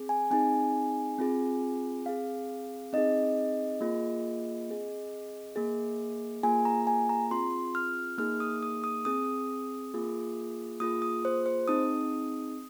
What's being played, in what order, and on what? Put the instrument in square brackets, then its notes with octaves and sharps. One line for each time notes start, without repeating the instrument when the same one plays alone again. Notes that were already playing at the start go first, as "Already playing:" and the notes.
Already playing: [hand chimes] C4 G#4
G#5
C4 D#4 G#4 G#5
C4 F4 G#4
C4 G#4 F5
C4 D#4 G#4 D#5
A#3 F4 G#4
C4 G#4
A#3 G#4
A#3 F4 G#4 G#5
A#5
G#5
A#5
C4 F4 G#4 C6
F6
A#3 D#4 G#4 F6
D#6
D#6
D#6
C4 G#4 D#6
A#3 F4 G#4
A#3 F4 G#4 D#6
D#6
C5
C5
C4 D#4 G#4 D#6